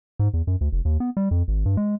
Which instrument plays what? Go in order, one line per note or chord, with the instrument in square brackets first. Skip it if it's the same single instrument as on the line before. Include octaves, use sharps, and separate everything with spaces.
[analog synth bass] G#2
E2
F#2
D2
F1
D#2
B3
G3
F2
G#1
G2
G#3